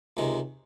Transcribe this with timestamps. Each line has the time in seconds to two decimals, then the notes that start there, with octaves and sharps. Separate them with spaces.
0.17 C#2 C3 D#3 G#3